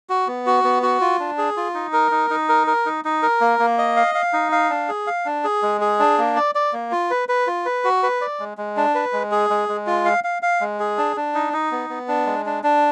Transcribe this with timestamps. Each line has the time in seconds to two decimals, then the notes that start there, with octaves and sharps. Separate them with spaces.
0.09 F#4
0.27 B3
0.46 F#4
0.64 B3
0.83 F#4
1.01 F4
1.20 D4
1.38 G#4
1.57 F4
1.74 D#4
1.93 A#4
2.11 D#4
2.30 D#4
2.49 A#4
2.67 A#4
2.86 D#4
3.05 D#4
3.23 A#4
3.41 A#3
3.59 A#3
3.78 D#5
3.97 F5
4.15 F5
4.33 D#4
4.52 F5
4.70 D4
4.89 G#4
5.07 F5
5.25 D4
5.44 G#4
5.62 G#3
5.81 G#4
6.00 D4
6.18 A#3
6.36 D5
6.55 D5
6.73 A#3
6.92 F4
7.10 B4
7.29 B4
7.47 F4
7.66 B4
7.84 F#4
8.03 B4
8.21 D5
8.39 G#3
8.58 G#3
8.77 D4
8.95 B4
9.13 G#3
9.31 G#4
9.50 G#3
9.69 G#3
9.87 F4
10.05 F5
10.24 F5
10.42 F5
10.61 G#3
10.80 G#4
10.98 D4
11.16 D4
11.35 D#4
11.53 D#4
11.71 B3
11.90 B3
12.08 D4
12.26 G#3
12.46 D4
12.63 D4